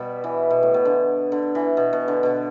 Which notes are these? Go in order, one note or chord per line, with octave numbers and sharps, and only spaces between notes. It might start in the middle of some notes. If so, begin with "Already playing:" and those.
Already playing: B2 G3
E3
B2
A2
B2
D3
D3
E3
B2
B2
D3
B2